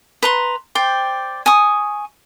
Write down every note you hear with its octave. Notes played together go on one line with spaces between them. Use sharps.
B4 A#5 C6
C5 D5 G5
G#5 C#6 D#6